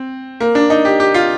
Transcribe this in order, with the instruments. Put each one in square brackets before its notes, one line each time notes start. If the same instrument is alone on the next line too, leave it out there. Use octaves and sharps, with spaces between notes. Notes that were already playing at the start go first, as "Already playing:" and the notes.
Already playing: [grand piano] C4
A#3
D4
D#4
G4
G4
F4